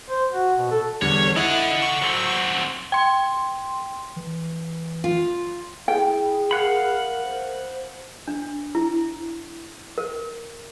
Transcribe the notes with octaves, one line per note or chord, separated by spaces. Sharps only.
C5
F#4
B2
A4
E2 D3 G3 C#5
E4 A4 D#5 F#5
C#6
F#3 C4
G5 C6
E3
F4
E4 G#4 G5
A#4 F5 F#5 B5
C5
D4
E4
A#4